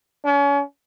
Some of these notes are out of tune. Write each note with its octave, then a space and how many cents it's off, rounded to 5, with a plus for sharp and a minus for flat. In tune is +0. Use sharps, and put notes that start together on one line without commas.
C#4 +35